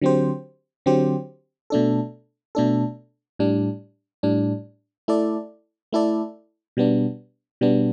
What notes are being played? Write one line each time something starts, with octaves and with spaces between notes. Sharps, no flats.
D3 F#3 C4 G4 C5
D3 F#3 C4 G4 C5
B2 A3 D4 A4
B2 A3 D4 A4
A2 G3 D4
A2 G3 D4
A3 E4 A4 D5
A3 E4 A4 D5
B2 G3 B3 D4
B2 G3 B3 D4